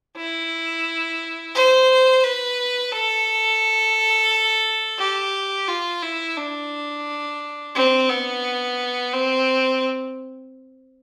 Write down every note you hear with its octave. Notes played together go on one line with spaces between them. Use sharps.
E4
C5
B4
A4
G4
F4
E4
D4
C4
B3
C4